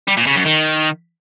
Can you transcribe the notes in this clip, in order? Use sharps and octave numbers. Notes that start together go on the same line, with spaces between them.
G3
A#2
C#3
F#2
D#3